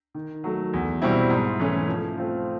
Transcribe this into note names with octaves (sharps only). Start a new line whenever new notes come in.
D#3
F#3 A3
E2
B2 G3 C4 E4
G#2
E3 A3 C#4
F3
A3 C4 F4